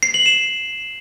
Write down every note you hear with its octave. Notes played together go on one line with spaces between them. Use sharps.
C7
F#7
E7